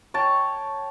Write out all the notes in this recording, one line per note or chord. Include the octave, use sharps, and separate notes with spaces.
C#5 G5 A5